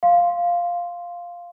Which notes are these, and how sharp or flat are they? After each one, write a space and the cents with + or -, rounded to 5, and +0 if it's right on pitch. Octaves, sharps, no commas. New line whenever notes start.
F5 +0 C6 +0